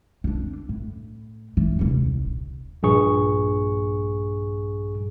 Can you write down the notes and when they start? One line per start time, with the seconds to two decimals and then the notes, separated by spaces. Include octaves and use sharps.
0.24 C4 D4
0.69 A2
1.57 E3
1.79 D#1 C2
2.83 A#1 G2 G#4 C#6